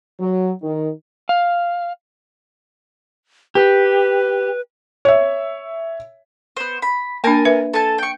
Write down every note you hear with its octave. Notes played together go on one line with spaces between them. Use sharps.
F#3
D#3
F5
G4 B4
C#5 E5
B3 C5
B5
A#3 D4 A#4 G#5 A5
B4 E5
A4 G#5 A5
G5 C#6